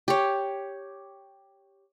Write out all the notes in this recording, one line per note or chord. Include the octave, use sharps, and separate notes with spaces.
G4 C#5